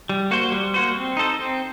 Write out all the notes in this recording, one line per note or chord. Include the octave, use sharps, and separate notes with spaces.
G3
A#3 F#4 C5
G3
A#3 F#4 C5
C4
D#4 A4 C5
C4